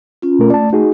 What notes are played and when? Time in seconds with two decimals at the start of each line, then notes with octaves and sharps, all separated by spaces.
0.22 C#4 F4
0.39 B2 A3 A#4
0.50 A3 D5 A5
0.73 D#4 F#4 G#4